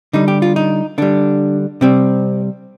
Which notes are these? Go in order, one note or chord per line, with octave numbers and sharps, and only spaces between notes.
D3 G3 D#4
G4
F4
D#4
D3 G3 D4
C3 G3 C4